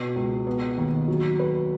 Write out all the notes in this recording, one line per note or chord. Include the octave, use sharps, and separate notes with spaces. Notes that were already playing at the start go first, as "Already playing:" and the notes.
Already playing: B2
C#2
B3
D#2
F#3
B4